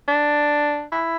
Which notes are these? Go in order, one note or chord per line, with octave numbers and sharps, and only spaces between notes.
D4
E4